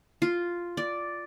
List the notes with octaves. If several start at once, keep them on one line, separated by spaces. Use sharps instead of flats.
F4
D5